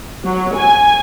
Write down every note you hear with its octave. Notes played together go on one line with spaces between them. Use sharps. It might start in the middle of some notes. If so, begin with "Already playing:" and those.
F#3
G#5